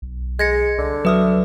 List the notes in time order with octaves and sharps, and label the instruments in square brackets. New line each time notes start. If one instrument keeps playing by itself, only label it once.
[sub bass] B1
[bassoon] G#3 [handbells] G#6 A#6 C#7
[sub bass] C2 [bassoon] D3
[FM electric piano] F#3 E5 [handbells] B4 D#6 F6